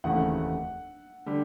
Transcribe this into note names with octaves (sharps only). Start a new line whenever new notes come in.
F1 D#2 C#3 E3 A3 F#5
D3 G3